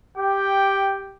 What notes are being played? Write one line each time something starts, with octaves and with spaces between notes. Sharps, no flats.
G4 G5